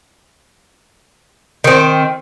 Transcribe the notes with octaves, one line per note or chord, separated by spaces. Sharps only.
D#3 C4